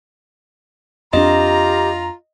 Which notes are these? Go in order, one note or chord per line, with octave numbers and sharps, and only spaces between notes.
F2 B3 D4 F4 G4 D#5 A#5